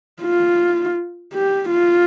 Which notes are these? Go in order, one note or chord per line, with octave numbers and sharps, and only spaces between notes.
F4
G4
F4